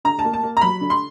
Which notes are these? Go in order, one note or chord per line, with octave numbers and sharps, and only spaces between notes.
D3 A#5
A5
A#3
A5
A#3
A#5
F#3 B5
D3
C6